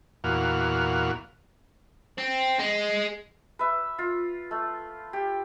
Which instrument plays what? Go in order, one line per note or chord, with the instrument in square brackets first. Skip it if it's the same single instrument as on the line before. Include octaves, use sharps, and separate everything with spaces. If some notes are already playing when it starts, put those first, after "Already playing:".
[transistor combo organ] E2 A#2 F#4 F5
[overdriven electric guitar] C4
G#3
[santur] B4 E5
F4
A3
G4